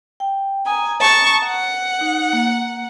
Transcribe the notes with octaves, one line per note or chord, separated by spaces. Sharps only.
G5
G#5 A#5 D#6
A5 C#6
F#5
D#4
A#3